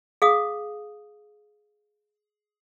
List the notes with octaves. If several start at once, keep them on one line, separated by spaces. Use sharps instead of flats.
G#4 F5 D#6